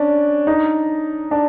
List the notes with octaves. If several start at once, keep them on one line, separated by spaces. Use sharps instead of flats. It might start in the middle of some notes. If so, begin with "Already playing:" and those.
Already playing: C#4 D4
D#4
D4